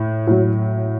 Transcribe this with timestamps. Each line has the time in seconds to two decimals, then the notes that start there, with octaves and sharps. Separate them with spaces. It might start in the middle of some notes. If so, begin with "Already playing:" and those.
Already playing: A2
0.27 A2 F#3